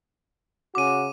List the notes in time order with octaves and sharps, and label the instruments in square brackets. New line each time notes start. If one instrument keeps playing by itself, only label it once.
[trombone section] C#3 C#4 F#4 [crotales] D6 D#7